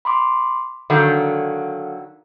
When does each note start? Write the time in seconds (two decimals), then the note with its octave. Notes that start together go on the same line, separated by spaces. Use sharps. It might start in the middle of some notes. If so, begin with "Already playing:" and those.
0.05 B5 C6 D6
0.90 D3 D#3 F#3 A4 F5